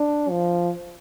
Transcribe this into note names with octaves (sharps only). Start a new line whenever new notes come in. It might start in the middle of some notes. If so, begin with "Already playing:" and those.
Already playing: D4
F3